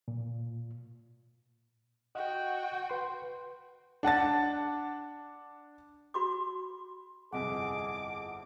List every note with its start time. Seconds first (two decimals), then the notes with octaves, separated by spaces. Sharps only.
0.08 A#2
2.15 F#4 D#5 F#5 G5
2.90 B4 C6
4.03 D4 F#5 A5 A6
6.14 F#4 B5 C6 D6
7.33 G1 C2 F2 G#4 D#5 F#5 D6